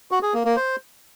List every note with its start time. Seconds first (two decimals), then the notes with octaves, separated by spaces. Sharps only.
0.11 F#4
0.23 G#4
0.34 A#3
0.45 A#3
0.56 C5